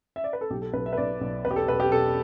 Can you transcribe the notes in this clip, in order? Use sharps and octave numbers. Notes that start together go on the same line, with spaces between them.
E5
D5
B4
A4
B1 G4
A4
B1 B4
E5
B4
B1 D5
B1
E1 B4
G4
A4
E1 B4
G4
E1 A4